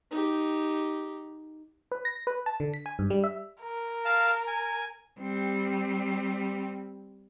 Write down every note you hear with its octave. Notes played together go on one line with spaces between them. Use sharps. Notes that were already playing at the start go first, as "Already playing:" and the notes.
D#4 G4
B4
A#6
B4
A5
D3
B6
G#5
G2
G3
E5
A#4
F5 A5 F6
G#5
G3 C4